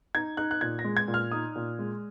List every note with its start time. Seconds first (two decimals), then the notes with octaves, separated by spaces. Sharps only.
0.15 D#4 G#6
0.37 D#4 F#6
0.51 F#6
0.61 A#2 G#6
0.79 A#6
0.84 G#3
0.97 G#6
1.08 A#2
1.14 F6
1.31 D#4 D#6
1.56 A#2
1.79 G#3